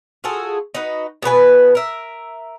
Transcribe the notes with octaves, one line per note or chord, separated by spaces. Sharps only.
F4 F#4 G#4 A4
D#4 F#4 B4 D#5
B2 B3 B4 G#5
A#4 E5